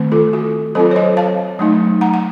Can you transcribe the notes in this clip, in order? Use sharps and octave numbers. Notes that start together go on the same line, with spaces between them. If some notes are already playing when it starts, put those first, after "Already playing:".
Already playing: D#3 A3 C4
F4 A4
F#4
F#3 C4 F4 A4 C5
C#5
C5 D#5
F5 A5
F#3 A3 D#4
F#5 A#5
F#5